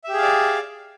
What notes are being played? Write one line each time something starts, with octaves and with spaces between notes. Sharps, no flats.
G4 G#4 D5 E5 F5